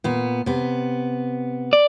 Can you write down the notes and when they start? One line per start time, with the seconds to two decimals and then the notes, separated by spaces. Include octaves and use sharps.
0.04 A#2 B3
0.46 C3 B3
1.73 D5